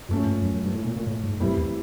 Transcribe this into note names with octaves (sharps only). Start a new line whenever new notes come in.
F#2 F3 A3 C#4
G2
F#2
F#2
G2
A2
A#2
A#2
A2
G#2
F#2 A2 E3 G3 C4 E4
E2